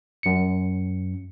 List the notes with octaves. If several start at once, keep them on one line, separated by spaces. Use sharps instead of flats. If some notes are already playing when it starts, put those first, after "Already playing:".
F#2 C#7